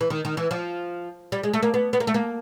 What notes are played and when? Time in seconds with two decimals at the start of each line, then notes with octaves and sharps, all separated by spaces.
0.01 E3
0.10 D#3
0.25 D#3
0.37 E3
0.51 F3
1.32 G3
1.43 G#3
1.54 A3
1.63 A#3
1.74 B3
1.93 B3
2.00 A#3
2.07 A3
2.14 A#3